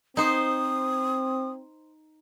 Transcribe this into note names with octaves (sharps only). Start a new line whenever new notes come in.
C4 D#4 C5 D#6